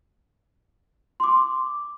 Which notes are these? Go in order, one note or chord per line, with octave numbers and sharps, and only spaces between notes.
C6 D6